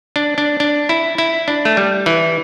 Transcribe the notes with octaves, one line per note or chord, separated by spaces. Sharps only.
D4
D4
D4
E4
E4
D4
A3
G3
E3